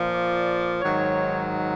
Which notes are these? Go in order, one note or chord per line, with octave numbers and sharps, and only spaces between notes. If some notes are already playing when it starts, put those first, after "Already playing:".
Already playing: A#2 F3
D5
G#2 D#3 F#3 C#5